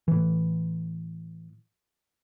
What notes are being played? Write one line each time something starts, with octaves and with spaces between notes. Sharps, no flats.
A2 E3